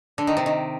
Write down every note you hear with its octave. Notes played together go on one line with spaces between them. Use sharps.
D3
D#3
C3
D#3